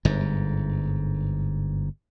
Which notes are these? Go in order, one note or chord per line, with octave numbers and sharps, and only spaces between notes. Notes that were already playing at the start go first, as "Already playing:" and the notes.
G1 G#2